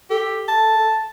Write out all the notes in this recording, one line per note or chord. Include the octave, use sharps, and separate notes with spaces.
G4 A4
A5